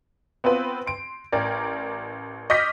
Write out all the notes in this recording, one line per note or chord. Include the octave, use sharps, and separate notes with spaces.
B3 C4 F4 B4
C6 D7
A1 A#4 D5
D#5 C#6 D6 F6 G6 B6